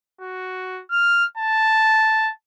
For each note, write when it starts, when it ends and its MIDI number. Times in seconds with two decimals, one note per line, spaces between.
0.21 0.82 66
0.90 1.24 89
1.37 2.31 81